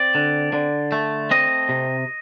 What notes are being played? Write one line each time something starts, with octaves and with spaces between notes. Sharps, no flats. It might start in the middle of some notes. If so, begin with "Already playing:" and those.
Already playing: C4 D5
D3
D3
A3
C4 D#5
C3